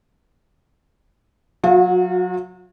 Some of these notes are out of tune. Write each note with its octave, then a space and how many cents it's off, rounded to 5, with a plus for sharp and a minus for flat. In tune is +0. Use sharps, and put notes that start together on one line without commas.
F#3 -20 F#4 -45 F5 -20